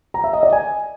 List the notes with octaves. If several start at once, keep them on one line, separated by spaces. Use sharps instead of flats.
A#5
E5
D#5
D5
G#5